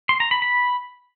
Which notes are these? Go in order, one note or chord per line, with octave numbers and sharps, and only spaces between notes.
C6
A#5
B5
B5